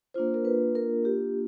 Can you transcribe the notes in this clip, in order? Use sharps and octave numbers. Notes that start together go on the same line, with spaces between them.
A#3 D4 F4 C5
A#4
B4
A#4
G4